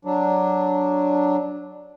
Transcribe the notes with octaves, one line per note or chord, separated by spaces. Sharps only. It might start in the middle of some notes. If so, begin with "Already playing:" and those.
F#3 D4